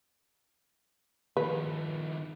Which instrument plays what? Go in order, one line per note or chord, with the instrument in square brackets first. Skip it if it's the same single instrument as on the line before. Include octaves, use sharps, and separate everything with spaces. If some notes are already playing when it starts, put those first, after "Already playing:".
[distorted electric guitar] D#3 F3 [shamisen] B4